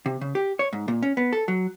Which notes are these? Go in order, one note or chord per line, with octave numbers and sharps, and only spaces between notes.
C3
C#3
G4
C#5
G#2
A#2
C#4
B3
A4
F#3